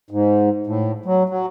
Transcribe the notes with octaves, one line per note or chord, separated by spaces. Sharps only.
G#2
A2
F#3
F#3